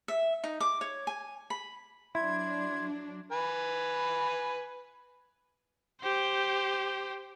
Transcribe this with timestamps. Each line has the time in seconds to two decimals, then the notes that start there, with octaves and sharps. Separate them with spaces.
0.08 E5
0.44 D#4
0.60 D6
0.81 C#5
1.07 G#5
1.50 B5
2.15 F#3 D4 E4 C6 G#6
3.32 B4 G#5
6.02 G4 C5